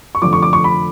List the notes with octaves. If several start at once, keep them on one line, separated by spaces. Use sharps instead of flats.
C#6
F1 F2 D3 F3 D6
C#6
D6
C#6
B5